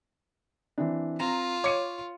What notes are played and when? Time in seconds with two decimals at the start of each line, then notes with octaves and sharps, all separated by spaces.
0.78 E3 C4 D4
1.20 C4 F4 A#5
1.64 C#5 D6 C#7 D#7